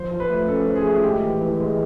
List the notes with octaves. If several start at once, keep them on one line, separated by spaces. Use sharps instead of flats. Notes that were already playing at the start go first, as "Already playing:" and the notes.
Already playing: F3 C5
F3
B4
A3
C#4 A4
F3
G#4
A3
G#3 G4
E3
E3
G#3